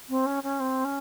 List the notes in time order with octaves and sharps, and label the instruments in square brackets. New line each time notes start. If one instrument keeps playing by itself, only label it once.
[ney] C4
C#4
C#4
C4
C#4